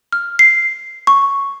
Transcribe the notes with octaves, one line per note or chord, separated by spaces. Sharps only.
F6
C7
C#6